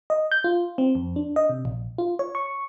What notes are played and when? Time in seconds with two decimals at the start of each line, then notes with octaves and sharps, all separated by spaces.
0.10 D#5
0.32 G6
0.44 F4
0.78 C4
0.95 F2
1.16 D4
1.36 D#5
1.49 C3
1.65 A#1
1.98 F4
2.19 C#5
2.35 C#6